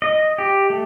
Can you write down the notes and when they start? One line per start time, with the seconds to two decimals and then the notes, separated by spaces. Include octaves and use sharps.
0.02 D#5
0.38 G4
0.70 A3